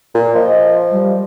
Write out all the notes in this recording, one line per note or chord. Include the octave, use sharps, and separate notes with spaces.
A#2
F3 D#5
G3